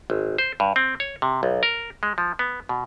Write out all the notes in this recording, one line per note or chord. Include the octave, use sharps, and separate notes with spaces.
G#1
C5
G2
C4
C#5
C3
B1
A#4
G#3
F3
B3
B2